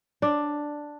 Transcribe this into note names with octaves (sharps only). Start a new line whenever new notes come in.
D4